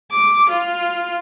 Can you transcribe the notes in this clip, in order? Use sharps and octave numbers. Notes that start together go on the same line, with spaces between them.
D6
F4